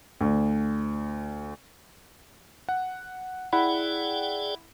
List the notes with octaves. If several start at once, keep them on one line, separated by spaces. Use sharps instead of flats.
D2
F#5
E4 G#4 D5 F#5 G5 B5